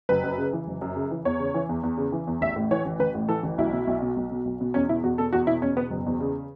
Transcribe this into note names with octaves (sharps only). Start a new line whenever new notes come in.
F#1 B4
F#2
C#3
E3
F#1
F#2
C#3
E3
E2 C#5
C#3
E3
E2
E2
C#3
E3
E2
A1 E5
A2
E3 C#5
A1
A1 B4
A2
E3 A4
A1
B1 E4
B2
B1
B2
B1
B2
B1
B2
E2 C#4
B2 E4
E2 F#4
B2 A4
E2 F#4
B2 E4
E2 C#4
B2 B3
F#1
E2
C#3